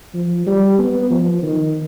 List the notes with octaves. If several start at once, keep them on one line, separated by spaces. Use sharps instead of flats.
F3
G3
B3
F3
D#3